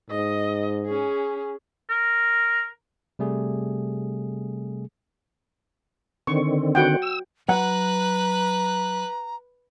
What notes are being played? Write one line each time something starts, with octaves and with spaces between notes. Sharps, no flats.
G#2 D#5
C#4 G#4
A#4
C3 G3 A3 G#4
D3 D#3 C4 C#6
F#4 F#5 G5
E6
F#3 B4 F#5 A#5 F#6